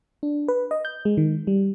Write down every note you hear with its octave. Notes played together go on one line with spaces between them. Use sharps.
D4
B4
D#5
G6
G#3
D#3
G3